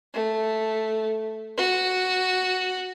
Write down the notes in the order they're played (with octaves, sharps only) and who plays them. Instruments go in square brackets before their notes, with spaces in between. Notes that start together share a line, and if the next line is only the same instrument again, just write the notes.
[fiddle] A3
F#4